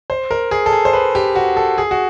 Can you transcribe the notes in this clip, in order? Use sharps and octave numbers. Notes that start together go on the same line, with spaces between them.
C5
A#4
G#4
A4
G#4
C5
B4
G4
F#4
A4
G#4
F#4